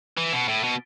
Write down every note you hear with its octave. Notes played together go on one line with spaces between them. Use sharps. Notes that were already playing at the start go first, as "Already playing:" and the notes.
E3
B2
A2
B2